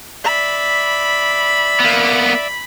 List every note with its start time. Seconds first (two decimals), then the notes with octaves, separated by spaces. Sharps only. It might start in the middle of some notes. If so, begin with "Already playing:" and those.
0.24 D5 E5 B5
1.80 A#3 B3